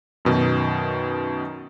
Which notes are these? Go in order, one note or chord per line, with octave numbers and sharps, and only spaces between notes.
F#2 B2 D#3